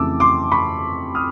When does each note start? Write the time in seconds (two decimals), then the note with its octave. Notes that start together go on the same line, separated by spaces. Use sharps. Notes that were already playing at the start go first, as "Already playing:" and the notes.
Already playing: F2 C#3 E3 A3 A5 D6 E6
0.20 C6 D6
0.52 B5 C#6
1.15 D#6 F6